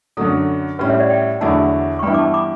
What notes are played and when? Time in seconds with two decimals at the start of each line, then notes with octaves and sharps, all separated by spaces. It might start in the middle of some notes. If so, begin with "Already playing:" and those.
0.17 F#2 D3 F#3 A4
0.79 A2 G3 C#4 B4
0.89 C#5 E5
1.00 D5 F#5
1.10 E5 G5
1.41 E2 D3 F#3 A3 E4 F#5 A5
1.99 C#6
2.03 G2 E3 B3 E4 G5 B5
2.14 D6
2.19 A5 C#6
2.34 B5 D6